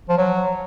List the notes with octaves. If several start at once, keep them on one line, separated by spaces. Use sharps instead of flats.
F3
F#3